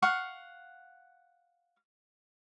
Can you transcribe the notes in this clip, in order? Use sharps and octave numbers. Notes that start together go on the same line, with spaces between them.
F5 F#5 C#6